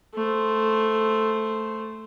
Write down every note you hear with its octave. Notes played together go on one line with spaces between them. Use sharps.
A3 C5